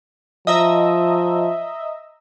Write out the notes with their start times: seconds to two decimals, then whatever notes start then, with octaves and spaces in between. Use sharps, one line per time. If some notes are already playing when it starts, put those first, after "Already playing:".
0.47 F3 D#5 E5 A#5